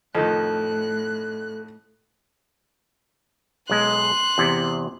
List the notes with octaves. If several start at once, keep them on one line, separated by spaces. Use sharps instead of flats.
F2 A2 D#3 A4 D#5 A5 F#6
B1 G#3 C6 F#6
E2 C3